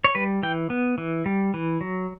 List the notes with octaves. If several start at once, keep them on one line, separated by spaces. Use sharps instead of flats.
C#5
G3 B4
E3 G5
B3
E3
G3
E3
F#3